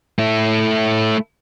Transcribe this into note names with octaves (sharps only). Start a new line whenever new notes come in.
A3 E4